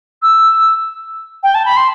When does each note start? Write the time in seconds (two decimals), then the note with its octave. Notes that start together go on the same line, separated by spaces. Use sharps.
0.22 E6
1.43 G5
1.54 A5
1.65 B5
1.76 C6